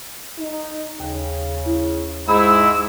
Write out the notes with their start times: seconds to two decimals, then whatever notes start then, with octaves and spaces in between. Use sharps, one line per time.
0.39 D#4
1.00 D#2 C#3
1.66 E4
2.28 G#2 G#3 D#4 E4 B5 E6